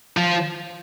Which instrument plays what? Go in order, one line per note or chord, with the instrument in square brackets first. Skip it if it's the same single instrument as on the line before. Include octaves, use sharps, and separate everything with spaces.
[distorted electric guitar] F3